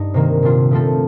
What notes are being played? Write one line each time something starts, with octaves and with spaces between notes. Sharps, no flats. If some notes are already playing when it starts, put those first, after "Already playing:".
Already playing: G2 D#4
C3 D#3 A#3
A#2 G3 D4 F4
F3 A3 C4 F4 A4